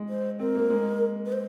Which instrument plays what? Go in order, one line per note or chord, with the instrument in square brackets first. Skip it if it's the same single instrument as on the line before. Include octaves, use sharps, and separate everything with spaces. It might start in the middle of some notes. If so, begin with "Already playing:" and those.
Already playing: [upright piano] G#3
[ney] C5
[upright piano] C4 [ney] A#4
[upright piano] A#3
G#3
[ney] B4
C5